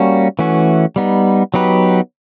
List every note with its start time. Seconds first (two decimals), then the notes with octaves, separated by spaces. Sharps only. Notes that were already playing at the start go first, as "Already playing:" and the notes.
Already playing: G3 A#3 C#4 F#4
0.39 E3 A3 C#4 F#4
0.96 G3 B3 D#4
1.54 F#3 B3 D#4 G4 B4